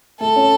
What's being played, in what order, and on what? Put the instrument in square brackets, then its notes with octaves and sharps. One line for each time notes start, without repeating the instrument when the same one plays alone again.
[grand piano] A3 [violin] A4
[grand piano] C#4